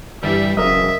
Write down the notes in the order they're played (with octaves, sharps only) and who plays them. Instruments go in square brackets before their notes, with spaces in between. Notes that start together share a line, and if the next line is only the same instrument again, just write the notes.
[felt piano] G1 E3 B6 [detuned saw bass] G3 [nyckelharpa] E5
[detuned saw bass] E1 [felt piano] C#3 F#3 [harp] A#4 D#5 [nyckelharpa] E5